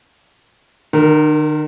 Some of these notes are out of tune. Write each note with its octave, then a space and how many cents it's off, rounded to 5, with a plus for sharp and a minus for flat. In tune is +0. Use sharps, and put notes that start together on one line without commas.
D#3 -45 A#4 +5